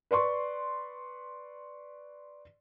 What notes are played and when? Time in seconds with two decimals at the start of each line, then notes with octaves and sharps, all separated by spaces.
0.11 B4 D5 C6 C#6